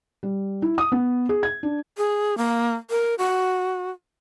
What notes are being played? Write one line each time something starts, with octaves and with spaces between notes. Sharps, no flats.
G3
E4
D#6
B3
G#4
G#6
D4
G#4
A#3
A#4
F#4